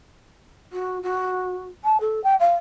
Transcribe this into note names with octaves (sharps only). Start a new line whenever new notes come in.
F#4
F#4
A5
A4
G5
F5